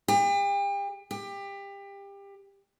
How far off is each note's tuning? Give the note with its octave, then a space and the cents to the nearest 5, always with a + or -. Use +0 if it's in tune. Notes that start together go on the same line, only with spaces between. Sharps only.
G4 +40
G4 +25